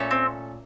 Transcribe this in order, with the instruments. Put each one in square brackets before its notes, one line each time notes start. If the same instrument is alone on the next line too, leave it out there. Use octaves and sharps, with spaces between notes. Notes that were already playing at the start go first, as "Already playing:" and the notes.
Already playing: [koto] A#2 A3 C#4 A4
[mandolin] C4